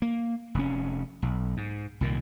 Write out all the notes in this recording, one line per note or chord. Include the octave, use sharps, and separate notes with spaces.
A#3
F1 C#4
B1
G#2
C2 A#2 D#3